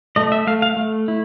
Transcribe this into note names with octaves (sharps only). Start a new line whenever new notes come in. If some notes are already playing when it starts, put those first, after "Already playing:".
A3 D#5
E5
A3 F5
F5
A3
E4